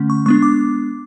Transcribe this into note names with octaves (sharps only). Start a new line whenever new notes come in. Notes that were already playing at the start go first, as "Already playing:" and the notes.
Already playing: D3 A3 C#4
C#6
G#3 B3 D4 C#6
D6